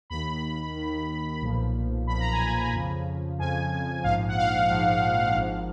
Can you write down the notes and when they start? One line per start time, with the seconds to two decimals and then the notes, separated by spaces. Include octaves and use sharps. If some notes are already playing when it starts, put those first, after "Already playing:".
0.10 D#2 D#3 B5
0.76 D#2 D#3
1.42 B1 A#2 F3
2.07 B1 A#2 F3 B5
2.20 A#5
2.33 G#5
2.46 A#5
2.73 F2 C#3 F3
3.38 F2 C#3 F3 G#5
4.04 A#1 G#2 F3 F5
4.29 F#5
4.38 F5
4.70 A#1 G#2 F3
5.36 G#1 G#2 F3